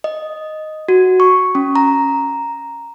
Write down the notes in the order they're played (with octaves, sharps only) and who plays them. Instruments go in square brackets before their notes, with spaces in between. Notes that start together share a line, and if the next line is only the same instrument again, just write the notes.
[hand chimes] D#5
F#4
C#6
C#4
A#5